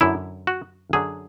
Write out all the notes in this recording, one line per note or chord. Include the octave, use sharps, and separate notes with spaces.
F#2 D3 F#3 E4
F#4
F#2 D3 F#3 G#4